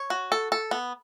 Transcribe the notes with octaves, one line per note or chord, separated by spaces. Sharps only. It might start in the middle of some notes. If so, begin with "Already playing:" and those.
Already playing: C#5
F#4
A4
A4
B3